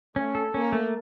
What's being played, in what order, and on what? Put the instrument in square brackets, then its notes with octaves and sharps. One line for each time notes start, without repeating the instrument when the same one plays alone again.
[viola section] A3 [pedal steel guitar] C#4
[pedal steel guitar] A4
[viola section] A#3 [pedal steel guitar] C#4
[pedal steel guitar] A3